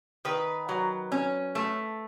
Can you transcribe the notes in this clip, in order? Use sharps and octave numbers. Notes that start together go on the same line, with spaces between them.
D#3 B4
F#3
C#4
A3